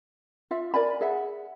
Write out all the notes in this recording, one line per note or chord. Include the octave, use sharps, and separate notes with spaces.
F4 E5
A#4 D5 G#5 B5
G#4 E5 F#5